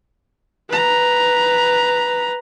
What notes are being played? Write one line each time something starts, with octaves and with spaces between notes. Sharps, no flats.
B4 A#5